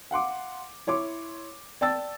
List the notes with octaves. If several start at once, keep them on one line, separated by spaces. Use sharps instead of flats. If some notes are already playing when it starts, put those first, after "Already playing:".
F5 F#5 C6 D6
E4 C#5 C6 D6
D5 G5 A5 E6 A6